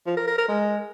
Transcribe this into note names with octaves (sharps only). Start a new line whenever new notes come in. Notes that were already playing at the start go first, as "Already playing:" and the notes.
F3
A#4
A#4
A#4
G#3